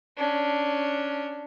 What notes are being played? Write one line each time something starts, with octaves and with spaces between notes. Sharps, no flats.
C#4 D4